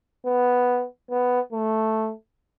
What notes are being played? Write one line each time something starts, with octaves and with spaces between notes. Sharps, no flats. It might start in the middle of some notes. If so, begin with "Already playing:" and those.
B3
B3
A3